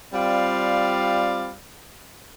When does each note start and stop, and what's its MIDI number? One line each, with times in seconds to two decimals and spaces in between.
0.13 1.52 55
0.13 1.52 60
0.13 1.52 65
0.13 1.52 74
0.13 1.52 77
0.13 1.52 83